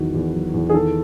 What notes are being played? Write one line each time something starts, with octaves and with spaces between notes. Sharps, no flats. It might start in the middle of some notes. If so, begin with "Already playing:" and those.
Already playing: E2 D#3 F#3 F#4
E2
F#3
E2
G#4
D#3 A4